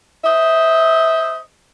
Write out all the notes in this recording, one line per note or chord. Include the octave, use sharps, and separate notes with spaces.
C5 D#5 E5